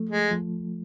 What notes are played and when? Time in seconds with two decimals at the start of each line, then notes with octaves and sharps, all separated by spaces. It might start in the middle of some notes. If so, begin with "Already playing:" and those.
Already playing: F3 A3
0.09 G#3
0.31 F3